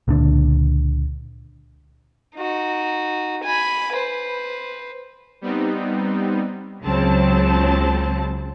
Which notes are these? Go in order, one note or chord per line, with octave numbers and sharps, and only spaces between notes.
C#2 A#2 D3 D4
D#4 F#4
G#5 B5
B4 C5
G3 B3 C4 D#4
C#2 C#3 F#3 C4 A5